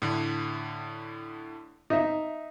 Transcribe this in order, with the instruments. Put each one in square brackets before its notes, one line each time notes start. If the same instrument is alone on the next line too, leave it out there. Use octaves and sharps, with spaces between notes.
[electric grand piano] A2 D3
[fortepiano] D#4 E5